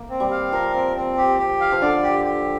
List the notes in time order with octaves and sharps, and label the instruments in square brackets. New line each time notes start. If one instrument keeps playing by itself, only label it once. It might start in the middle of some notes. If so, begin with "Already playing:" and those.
Already playing: [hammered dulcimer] A#3
[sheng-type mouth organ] C4
[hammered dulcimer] G3
[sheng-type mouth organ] F5
[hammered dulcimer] F3 [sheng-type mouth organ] A#4
[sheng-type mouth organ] C4
C4
G4
G4
F5
[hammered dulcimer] F3
[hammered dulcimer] D3 [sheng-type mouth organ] D5
[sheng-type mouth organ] G4
G4